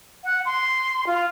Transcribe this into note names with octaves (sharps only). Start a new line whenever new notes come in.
F#5
C6
F4